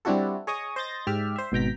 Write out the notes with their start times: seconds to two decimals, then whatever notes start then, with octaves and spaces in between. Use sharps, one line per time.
0.05 G3 C4 D4 E4 F#4 A4
0.47 G#4 C#5 D#5 C#6 D#6
0.76 C5 D#5 G6 A6 A#6
1.07 G#2 G4 D5 E5 F6
1.36 C5 E5
1.52 G#1 B2 G5 A#5 B6